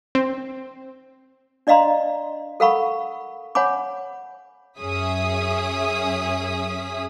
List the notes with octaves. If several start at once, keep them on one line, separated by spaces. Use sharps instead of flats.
C4
D4 D5 D#5 F5 A#5 C6
A4 A#4 F5 F#5 B5 C#6
C#5 F#5 G#5 B5 D6
F#2 C#4 G#4 E5 D#6 B6